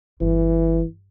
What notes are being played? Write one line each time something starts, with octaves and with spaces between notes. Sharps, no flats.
G1 E3